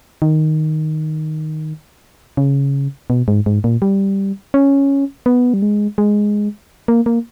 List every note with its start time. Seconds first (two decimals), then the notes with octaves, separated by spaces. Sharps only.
0.22 D#3
2.37 C#3
3.10 B2
3.28 G#2
3.46 G#2
3.64 A#2
3.82 G3
4.54 C#4
5.26 B3
5.54 G3
5.62 G#3
5.98 G#3
6.88 A#3
7.06 A#3